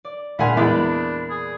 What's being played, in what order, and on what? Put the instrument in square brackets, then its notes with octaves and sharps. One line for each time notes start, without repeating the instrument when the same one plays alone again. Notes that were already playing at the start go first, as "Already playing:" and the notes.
[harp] D5
[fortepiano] D2 F#5 G#5 [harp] A#2 C6 F6 [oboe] B5
[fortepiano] E2 G#3 [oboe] D4 [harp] D5 B5
[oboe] G#4